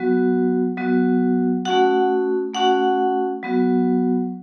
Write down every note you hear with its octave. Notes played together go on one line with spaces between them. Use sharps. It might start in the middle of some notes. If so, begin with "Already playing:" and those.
Already playing: F#3 B3 F#4
F#3 B3 F#4
A3 C#4 F#4 F#5
A3 C#4 F#4 F#5
F#3 B3 F#4